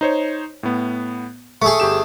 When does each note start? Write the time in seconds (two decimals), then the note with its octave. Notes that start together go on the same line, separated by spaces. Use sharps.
0.01 D#4 C5 C#5
0.63 A2 B3
1.62 A3 G#4 C#6
1.80 G1 G4 E7